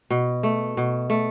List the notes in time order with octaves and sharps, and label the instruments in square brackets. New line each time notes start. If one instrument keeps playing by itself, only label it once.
[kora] B2
A3
B2
A3